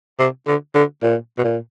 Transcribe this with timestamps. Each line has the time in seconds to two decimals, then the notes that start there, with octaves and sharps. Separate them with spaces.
0.19 C3
0.47 D3
0.75 D3
1.03 A#2
1.38 B2
1.44 A#2